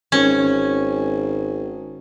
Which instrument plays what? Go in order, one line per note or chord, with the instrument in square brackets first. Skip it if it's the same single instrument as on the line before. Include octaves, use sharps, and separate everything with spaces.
[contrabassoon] G#1 [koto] C#4